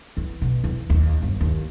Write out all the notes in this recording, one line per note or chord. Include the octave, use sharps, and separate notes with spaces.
E2
B2
E2
D#2
G1
D#2